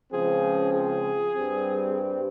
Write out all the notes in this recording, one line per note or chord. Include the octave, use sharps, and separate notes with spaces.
C#2 C#3 F3 C4 G#4
G#4
G2 G3 C4